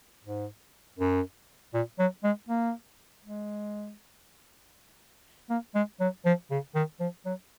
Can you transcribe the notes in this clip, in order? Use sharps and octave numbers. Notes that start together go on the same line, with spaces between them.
G#2
F#2
A#2
F#3
G#3
A#3
G#3
A#3
G#3
F#3
F3
C#3
D#3
F3
F#3